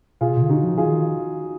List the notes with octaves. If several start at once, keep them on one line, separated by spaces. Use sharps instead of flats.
B2 F4 G#4
B2
D3
D#4 F#4
F3
F4 G#4
D#3